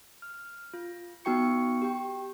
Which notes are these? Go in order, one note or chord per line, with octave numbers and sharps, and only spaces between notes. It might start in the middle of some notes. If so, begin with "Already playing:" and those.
F6
F4
B3 D#4 F#4 G5 C#6 C#7
G4 G5